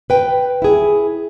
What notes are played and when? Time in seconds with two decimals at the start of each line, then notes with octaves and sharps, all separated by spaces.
0.10 B4 G5
0.62 E4 G#4